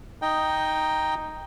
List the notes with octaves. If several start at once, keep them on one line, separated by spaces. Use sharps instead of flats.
D#4 D#5 G5